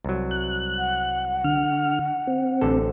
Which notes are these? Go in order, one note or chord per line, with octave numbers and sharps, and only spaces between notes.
C2 F#3
F#6
F#5
D3 F6
C4
A1 D3 A4